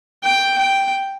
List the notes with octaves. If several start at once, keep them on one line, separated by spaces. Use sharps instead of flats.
G5
G5